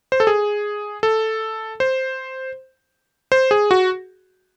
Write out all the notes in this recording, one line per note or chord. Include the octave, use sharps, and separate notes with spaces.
C5
A4
G#4
A4
C5
C5
G#4
F#4